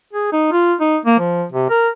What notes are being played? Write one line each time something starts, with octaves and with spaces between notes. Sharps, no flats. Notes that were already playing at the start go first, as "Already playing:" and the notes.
G#4
D#4
F4
D#4
A#3
F3
C3
A#4